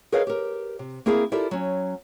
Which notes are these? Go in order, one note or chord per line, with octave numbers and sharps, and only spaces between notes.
G#4 A#4 B4 C#5 D#5 F5
G4 A#4
C3
A#3 C4 E4 G#4 A#4 F5
E4 F4 G4 A4 A#4 D5
F#3 C#4